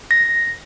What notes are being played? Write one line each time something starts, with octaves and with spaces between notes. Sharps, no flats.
A#6